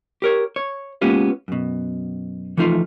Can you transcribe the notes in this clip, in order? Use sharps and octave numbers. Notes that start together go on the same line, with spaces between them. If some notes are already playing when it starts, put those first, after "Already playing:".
G4 A#4 C#5
C#5
G#3 A#3 B3 C#4 F4 G4
F#2 B2
E3 F3 A3 D#4 F4